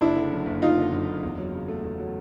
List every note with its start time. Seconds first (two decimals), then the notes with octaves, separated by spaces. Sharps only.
0.01 F#1 D4 E4
0.16 D3
0.31 F#2
0.46 F#1
0.62 F#1 D#4 F4
0.77 D3
0.92 F#2
1.07 F#1
1.23 E2
1.38 F#3
1.53 C#3
1.68 A3
1.84 E2
1.99 F#3